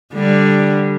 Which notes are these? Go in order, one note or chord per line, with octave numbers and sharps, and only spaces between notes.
D3 G3